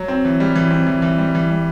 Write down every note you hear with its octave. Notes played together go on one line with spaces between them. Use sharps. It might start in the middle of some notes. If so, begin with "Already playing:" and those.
Already playing: F#3
C4
E3
G3
E3
C4
E3
E3
G3
E3
G3